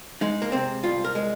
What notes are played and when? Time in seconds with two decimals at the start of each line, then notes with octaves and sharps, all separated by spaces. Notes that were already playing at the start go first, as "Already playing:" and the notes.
0.21 G#3 D#4
0.42 A#3
0.52 C3 C4
0.83 C2 F4
1.04 A#4
1.15 G#3